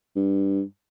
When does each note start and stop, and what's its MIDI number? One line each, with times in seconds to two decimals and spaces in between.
0.16 0.62 43